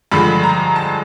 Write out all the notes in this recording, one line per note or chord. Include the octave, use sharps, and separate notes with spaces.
G2 D3 F3 G#3 B5
A#5
A5